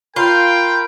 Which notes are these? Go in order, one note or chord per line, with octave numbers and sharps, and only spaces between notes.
F4 A#4 G5 B5